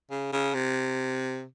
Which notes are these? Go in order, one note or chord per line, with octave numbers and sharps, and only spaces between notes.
C#3
C#3
C3